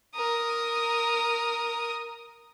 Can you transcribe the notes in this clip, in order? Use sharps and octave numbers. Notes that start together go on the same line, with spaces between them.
A#4 D#6